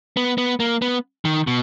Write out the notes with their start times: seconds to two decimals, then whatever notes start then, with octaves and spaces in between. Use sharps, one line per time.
0.17 B3
0.38 B3
0.60 A#3
0.82 B3
1.25 D#3
1.47 B2